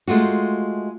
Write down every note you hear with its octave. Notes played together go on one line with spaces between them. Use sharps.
G#3 A3 F4 F#4